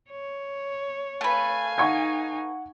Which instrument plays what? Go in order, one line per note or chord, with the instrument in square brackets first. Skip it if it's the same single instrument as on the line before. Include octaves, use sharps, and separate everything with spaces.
[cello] C#5
[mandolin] A3 B4 [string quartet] F5 G#5
[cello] D#4 [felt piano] F#5 C#6 G#6